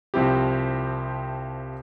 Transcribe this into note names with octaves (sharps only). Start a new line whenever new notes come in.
C2 F3 C4 E4 G4